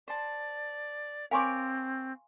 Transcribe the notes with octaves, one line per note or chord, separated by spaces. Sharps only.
C5 D5 A5
C4 A#4 C#5 F5 G#5 C6 D6